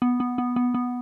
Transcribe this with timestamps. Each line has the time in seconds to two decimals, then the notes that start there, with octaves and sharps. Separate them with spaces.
0.02 B3
0.20 B3
0.38 B3
0.56 B3
0.74 B3